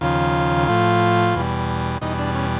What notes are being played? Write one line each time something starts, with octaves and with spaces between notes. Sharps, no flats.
D#2 C#3 F3 F4
A2 F3
E2 B2 G3
E2 B2 G3 D#4
D4
C#4